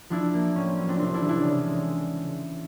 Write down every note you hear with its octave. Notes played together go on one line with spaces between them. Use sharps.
F3 D4 E4
A#3
A2 C#4
C4
F#3 C#4
C4 D4
C2 C4 D4
D4 E4
E3
D4 E4
C#3
G#3